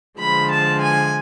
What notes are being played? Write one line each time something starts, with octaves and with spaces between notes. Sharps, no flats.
D3 F3 G#3 B5
A5
G#5